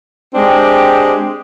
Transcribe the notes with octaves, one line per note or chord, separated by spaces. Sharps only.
G#3 C4 D4 G4